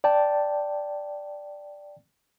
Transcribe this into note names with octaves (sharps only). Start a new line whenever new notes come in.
D5 G5 A5